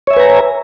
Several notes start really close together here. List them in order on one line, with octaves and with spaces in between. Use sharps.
C#5 E5 G#5 B4 A#5